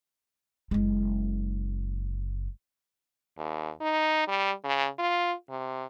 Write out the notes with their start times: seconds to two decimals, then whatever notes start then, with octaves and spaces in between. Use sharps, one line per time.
0.71 F#1 G#3
3.38 D#2
3.81 D#4
4.28 G3
4.64 C#3
4.99 F4
5.50 C3